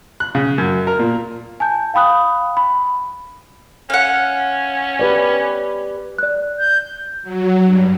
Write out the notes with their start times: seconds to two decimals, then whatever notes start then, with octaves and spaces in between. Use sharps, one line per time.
0.20 F#6
0.35 C#3
0.58 F#2
0.87 A#4
0.99 A#2
1.60 G#5 A5 G6
1.94 F5 G5 B5 D#6 F#6
2.57 B5
3.90 C#4 F5 F#5
4.99 G4 B4 D5
6.18 D5 F#6
6.59 G6
7.23 F#3
7.65 G2